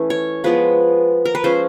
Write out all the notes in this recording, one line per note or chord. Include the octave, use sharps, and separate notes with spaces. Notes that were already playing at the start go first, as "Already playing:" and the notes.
Already playing: E3 A3 C#4
C#5
F3 G#3 B3 B4
A#4
B4
F3 G#3 C#4 C5